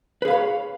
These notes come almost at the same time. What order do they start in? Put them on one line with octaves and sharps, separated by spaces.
B4 G#4 F5 B5 C#5